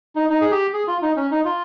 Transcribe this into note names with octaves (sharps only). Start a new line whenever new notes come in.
D#4
D#4
G#4
G4
G#4
F4
D#4
C#4
D#4
F4